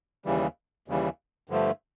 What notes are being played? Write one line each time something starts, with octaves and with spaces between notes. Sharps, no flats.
D#2 C#3 E3 G3
D#2 C#3 E3 G3
G2 D3 F3 A3